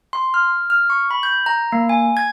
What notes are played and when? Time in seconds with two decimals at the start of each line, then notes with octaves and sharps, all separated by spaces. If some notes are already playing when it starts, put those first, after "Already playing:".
0.13 C6
0.34 F6
0.70 F6
0.90 C#6
1.11 B5
1.23 G6
1.46 A#5
1.72 A#3
1.89 G#5
2.17 G#6